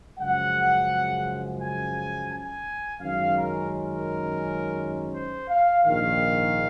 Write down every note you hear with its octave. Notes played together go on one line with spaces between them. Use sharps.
F#2 C#3 F3 G#3 F#5
G#5
G#5
F#2 D#3 G#3 C#4 F5
A#4
A#4
C5
F5
A#1 G#2 D#3 F5